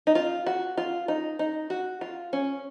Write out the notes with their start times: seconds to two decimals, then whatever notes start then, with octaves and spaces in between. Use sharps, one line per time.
0.07 D#4
0.15 F4
0.46 F#4
0.77 F4
1.08 D#4
1.39 D#4
1.70 F#4
2.01 F4
2.33 C#4